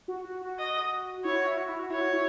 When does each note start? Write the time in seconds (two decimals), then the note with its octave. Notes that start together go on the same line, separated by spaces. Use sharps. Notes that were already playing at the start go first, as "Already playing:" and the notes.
0.08 F#4
0.25 F#4
0.42 F#4
0.59 D#5
1.25 E4 C#5
1.36 F#4
1.47 E4
1.58 F#4
1.69 E4
1.79 F#4
1.90 E4 C#5
2.01 F#4
2.13 E4